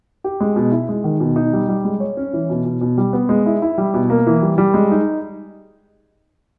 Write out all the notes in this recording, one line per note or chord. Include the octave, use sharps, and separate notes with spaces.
G4
G#3
B2
E4
G#3
D#3
B2
D#4
G3
G3
G#3
C#5
C#4
E3
B2
B2
B2
G3
B3
G#3
E4
E4
G3
B2
A#3
E3
G3
G3
G#3
D#4